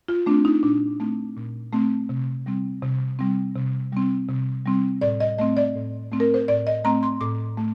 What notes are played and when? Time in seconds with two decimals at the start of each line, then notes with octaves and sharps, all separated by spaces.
0.08 F4
0.26 A3 C4 D4
0.45 D#4
0.63 A#2 D4
1.00 A3 C4
1.36 A#2
1.73 A3 C4
2.09 C3
2.46 G3 C4
2.83 C3
3.19 G3 C4
3.55 C3
3.92 G3 C4
4.29 C3
4.66 G3 C4
5.01 A2 D5
5.20 D#5
5.38 A3 C4 D#5
5.57 D5
5.75 A2
6.12 A3 C4
6.20 A#4
6.34 C5
6.48 A2 D5
6.67 D#5
6.84 A3 C4 A#5
7.03 C6
7.21 A2 D6
7.57 A3